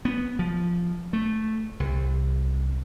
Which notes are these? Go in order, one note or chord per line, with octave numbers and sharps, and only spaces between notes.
B3
F3
A3
C2